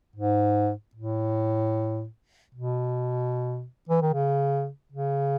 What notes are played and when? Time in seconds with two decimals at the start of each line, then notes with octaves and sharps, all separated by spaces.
0.16 G#2
0.95 A2
2.55 B2
3.89 E3
4.02 D#3
4.13 C#3
4.92 C#3